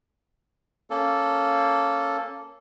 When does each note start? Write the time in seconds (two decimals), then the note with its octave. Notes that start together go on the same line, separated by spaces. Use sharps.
0.90 A#3 C#4 A4